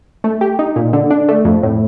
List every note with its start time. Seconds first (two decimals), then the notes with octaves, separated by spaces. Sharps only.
0.24 A3
0.41 G4
0.59 D#4
0.76 A#2
0.93 D3
1.11 D4
1.29 A3
1.45 F2
1.63 A2